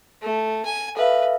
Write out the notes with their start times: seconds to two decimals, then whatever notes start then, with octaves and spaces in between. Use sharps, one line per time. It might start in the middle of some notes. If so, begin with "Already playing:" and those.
0.22 A3
0.65 G#5
0.97 A4 B4 E5 F5